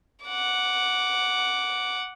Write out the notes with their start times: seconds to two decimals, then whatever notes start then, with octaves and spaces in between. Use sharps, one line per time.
0.24 F#5 D6